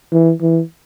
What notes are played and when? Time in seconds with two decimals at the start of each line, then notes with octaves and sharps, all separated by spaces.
0.12 E3
0.41 E3